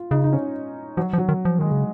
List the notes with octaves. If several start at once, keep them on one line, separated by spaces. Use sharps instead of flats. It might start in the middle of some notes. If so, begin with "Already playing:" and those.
Already playing: F4
C#3 D#4
D#4
C#4
F3 F#3
F3
F#3
D#3
F3
D#3 G#3
C#3